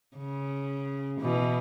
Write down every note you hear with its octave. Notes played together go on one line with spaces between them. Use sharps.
C#3
B2 E3